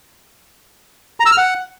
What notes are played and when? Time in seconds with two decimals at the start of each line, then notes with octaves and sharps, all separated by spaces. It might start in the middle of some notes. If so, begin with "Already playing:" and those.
1.20 A#5
1.26 E6
1.32 F6
1.38 F#5